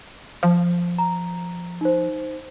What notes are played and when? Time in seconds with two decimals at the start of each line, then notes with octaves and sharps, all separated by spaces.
0.43 F3
0.98 A#5
1.81 D#4 C5